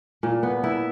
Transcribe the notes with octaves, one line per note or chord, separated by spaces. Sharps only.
A#2
B3
E4